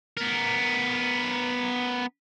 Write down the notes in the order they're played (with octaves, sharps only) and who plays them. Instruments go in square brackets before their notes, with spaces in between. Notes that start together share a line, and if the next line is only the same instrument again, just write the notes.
[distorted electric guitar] B3 A#4